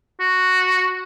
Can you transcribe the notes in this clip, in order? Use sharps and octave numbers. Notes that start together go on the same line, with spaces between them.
F#4